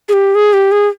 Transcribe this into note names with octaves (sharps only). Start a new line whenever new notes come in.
G#4
G4
G#4
G4
G#4